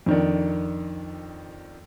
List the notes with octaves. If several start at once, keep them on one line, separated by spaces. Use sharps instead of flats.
F2 D#3 D4